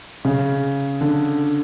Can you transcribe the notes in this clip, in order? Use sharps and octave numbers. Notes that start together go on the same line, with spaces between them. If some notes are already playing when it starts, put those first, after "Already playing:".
C#3
D3